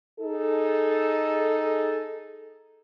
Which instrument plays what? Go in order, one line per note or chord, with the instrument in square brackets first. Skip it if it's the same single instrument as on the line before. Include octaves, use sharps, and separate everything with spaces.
[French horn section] D#4 G#4 A4